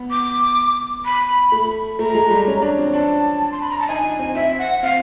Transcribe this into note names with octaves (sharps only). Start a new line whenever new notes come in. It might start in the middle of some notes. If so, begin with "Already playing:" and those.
Already playing: B3
D6
B5
A3
A3 A#5
G#3
G3
C#4
D4
C4
D4 A5
C6
B5
A#5
A5
D#4 G#5
C4
C4 E5
F#5
C4 F5